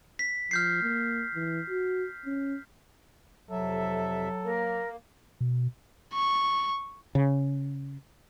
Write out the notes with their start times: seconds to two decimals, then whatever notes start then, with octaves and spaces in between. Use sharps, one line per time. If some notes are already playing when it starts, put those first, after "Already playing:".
0.19 B6
0.51 F3 F6 G6 C7
0.82 A#3
1.35 E3
1.70 F#4
2.26 C#4
3.51 F2 C3 F#3 A4 E5
4.44 A#3 A#4
5.41 B2
6.14 C#6
7.15 C#3